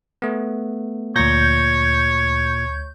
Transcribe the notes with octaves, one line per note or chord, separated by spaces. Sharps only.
A3 B3
D2 A#2 C#5 G6 A#6